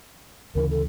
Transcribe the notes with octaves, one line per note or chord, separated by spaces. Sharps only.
D2 C#3 E3 A#4
A4